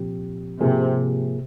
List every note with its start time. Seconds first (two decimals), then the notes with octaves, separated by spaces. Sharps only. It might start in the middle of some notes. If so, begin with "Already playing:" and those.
Already playing: C2 A#2 F3 C4 G4
0.60 G#2 C3 F3 A#3 F4 G#4